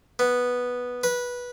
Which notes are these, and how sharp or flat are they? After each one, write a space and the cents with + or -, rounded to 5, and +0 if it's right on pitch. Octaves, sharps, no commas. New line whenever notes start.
B3 -5
B4 -15